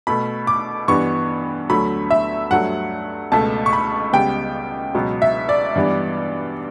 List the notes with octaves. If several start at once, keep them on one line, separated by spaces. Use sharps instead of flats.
B2 A3 B5
D6
G2 E3 G3 B3 C#6
D2 D3 F#3 A3 B5
E5
G2 F#3 A3 F#5
C#2 B2 A3 A5
C#6
B5
C#2 C#3 G3 B3 G5
C#2 B2 F#3 B3
E5
D5
G2 E3 G3 B3